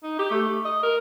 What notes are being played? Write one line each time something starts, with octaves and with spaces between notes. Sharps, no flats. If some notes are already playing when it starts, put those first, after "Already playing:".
D#4
G4
A3
D#5
A#4